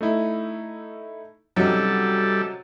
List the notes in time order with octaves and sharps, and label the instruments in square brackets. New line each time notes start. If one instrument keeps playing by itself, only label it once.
[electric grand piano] A3 D#4 E4
[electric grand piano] C3 C#4 D#4 [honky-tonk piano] F#3 [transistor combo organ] G3 A4